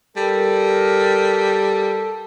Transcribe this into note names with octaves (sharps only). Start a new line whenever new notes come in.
G3 A4 A#4